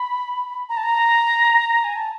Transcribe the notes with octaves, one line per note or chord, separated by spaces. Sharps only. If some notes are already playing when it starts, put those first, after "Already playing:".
Already playing: B5
A#5
A5
A#5
G#5
A5